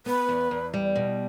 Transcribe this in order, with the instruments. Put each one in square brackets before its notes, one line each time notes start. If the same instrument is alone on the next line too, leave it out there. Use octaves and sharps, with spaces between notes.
[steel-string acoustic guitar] B3 [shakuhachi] B4
[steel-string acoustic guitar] E2
E2
G3
B2